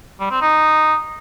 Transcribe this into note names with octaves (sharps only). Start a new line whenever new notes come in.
G3
C4
D#4